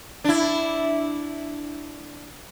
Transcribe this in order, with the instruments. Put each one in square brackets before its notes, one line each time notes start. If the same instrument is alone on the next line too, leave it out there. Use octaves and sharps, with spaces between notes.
[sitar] D4 E4